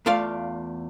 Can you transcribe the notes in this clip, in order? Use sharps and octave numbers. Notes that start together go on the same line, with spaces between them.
E2 A3 F4 D5 F5